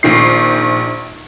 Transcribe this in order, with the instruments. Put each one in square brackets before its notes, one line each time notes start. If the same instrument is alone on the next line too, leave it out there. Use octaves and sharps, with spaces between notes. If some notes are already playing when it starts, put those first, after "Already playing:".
[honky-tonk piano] A#1 D#3 C7